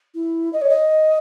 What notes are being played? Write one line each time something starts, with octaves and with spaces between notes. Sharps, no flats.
E4
D#5
C#5
D#5